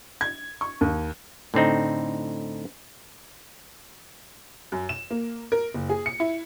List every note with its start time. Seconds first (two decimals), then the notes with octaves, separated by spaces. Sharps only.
0.21 G#6
0.61 C#6
0.81 D#2
1.54 A2 D3 C4 D#4
4.72 F#2
4.89 E7
5.11 A#3
5.52 A#4
5.74 F#1
5.89 G#4
6.06 C#7
6.20 E4